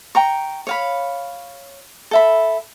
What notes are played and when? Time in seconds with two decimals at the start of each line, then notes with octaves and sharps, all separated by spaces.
0.15 G5 A#5 C#6
0.67 C#5 F5 B5
2.11 A4 E5 B5